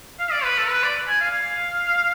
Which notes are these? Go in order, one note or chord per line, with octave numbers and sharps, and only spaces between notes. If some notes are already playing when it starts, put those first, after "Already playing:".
F5
D5
B4
A4
B4
D5
G#5
F5